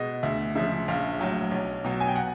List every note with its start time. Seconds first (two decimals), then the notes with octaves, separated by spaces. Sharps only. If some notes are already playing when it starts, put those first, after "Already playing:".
Already playing: B2 G#3 D#5
0.23 D2 E5
0.55 C#3 F3 G#3 E5
0.88 A#1 F5
1.19 A2 F#3
1.51 B1
1.84 B2 F#3
2.00 G#5
2.08 G5
2.16 F#5